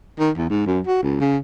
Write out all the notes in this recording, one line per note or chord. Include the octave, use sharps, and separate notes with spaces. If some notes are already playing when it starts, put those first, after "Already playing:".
D#3
E2
G#2
F#2
F#4
C#2
C#3